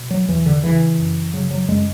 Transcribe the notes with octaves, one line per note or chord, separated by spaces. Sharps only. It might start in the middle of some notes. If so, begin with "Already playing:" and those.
Already playing: B2
F#3
E2 E3
D3
C#3 E3
F#2
C#3 F#3
F#3
F#2 G#3